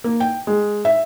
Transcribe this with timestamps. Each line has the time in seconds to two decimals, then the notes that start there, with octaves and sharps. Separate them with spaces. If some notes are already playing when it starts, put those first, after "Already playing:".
0.04 A#3
0.20 G5
0.47 G#3
0.85 E5